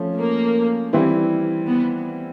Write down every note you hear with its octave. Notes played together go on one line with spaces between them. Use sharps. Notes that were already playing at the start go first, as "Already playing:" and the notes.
Already playing: F3 A3 C#4
A#3
E3 G3 C4 E4
B3